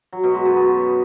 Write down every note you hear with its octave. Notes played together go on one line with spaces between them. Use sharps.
F#3
B2
G#3
F#2
B3